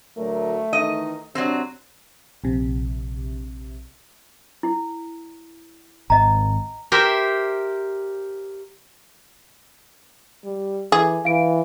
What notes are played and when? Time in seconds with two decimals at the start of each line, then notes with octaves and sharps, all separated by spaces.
0.18 D2 F#3 A3 A#4
0.73 D#3 E3 D#4 D#5
1.35 C3 F#3 C4 D4
2.44 A#1 C3
4.63 E4
6.10 G#1 D#5 A#5
6.92 G4 A#4 C5 E5
10.44 G3
10.92 E3 G#4 A4
11.25 E3 F5 D7